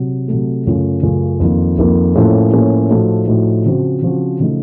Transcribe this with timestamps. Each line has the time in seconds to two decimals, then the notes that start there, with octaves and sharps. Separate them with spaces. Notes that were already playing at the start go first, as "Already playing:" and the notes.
Already playing: C3 F#3
0.28 C3 F#3 A3
0.66 F#2 C#3 A3 C#4 F4
1.03 F#2 C#3 A3 C#4 F4
1.40 F2 D#3 A#3 F4
1.78 F2 D#3 A#3 F4
2.15 A2 F3 A#3 C#4 A4
2.52 A2 F3 A#3 C#4 A4
2.90 A2 F3 A3 D#4 F#4
3.27 A2 F3 A3 D#4 F#4
3.65 C#3 F3 C4 F#4
4.02 C#3 F3 C4 F#4
4.40 C#3 F3 A3 D#4